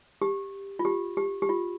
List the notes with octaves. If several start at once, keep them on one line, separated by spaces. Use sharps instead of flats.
G4
F4
G4
G4
G4
F4